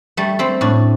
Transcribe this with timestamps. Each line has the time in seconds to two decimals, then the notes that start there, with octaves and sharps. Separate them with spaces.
0.17 G3 A3
0.39 G3 C4
0.61 A2 D4